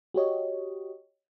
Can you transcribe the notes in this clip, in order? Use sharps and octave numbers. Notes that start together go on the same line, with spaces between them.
F#4 G4 C#5 D#5